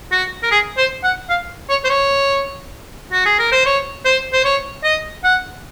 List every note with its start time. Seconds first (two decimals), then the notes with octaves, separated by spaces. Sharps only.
0.12 F#4
0.43 A#4
0.51 G#4
0.77 C5
1.04 F#5
1.29 F5
1.69 C#5
1.84 C5
1.90 C#5
3.12 F#4
3.26 G#4
3.39 A#4
3.52 C5
3.66 C#5
4.05 C5
4.33 C5
4.44 C#5
4.84 D#5
5.24 F#5